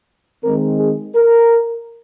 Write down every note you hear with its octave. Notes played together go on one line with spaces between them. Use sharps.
D#3 G#3 C4 A#4
G#4
A#4